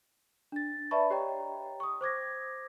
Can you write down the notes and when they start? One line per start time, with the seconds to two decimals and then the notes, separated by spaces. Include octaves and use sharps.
0.52 D4 A6
0.91 B4 D5 E5 A5 B5 C#6
1.10 G4 C#5 D#5 G5 A#5
1.80 C#6 D#6
2.01 C5 D6 G#6 A#6